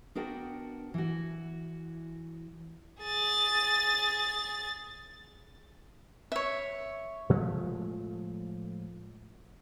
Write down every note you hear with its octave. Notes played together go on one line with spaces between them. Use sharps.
B3 D4 F#4 A#4 F#5 G5
E3 F#4
G#4 A6
C#5 E5
A2 F3 G#3 A3